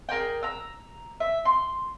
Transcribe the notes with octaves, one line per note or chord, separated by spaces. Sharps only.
G#4 A#4 D5 G5
A#5 E6
E5
C6